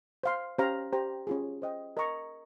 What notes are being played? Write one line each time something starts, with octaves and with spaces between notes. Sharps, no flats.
C5 F5 C6
C#4 G4 C5 F5 A#5
G4 C5 G5 A#5
C#4 F4 G#4
C5 D#5 G5
A#4 D#5 A#5 C#6